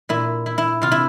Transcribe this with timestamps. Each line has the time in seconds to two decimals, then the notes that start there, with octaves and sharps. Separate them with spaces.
0.09 A#2 E4
0.46 E4
0.58 E4
0.82 C3 F4
0.92 E4